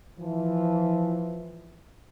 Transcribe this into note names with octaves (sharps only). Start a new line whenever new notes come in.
E3 F3